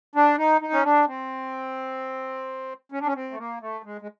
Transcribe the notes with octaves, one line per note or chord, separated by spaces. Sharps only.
D4
D#4
D#4
C#4
D4
C4
C#4
D4
C#4
C4
A3
A#3
A3
G#3
G#3